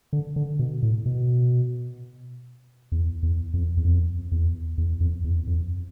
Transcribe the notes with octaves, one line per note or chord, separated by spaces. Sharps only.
D3
D3
B2
A2
B2
E2
E2
F2
E2
F2
E2
E2
F2
E2
F2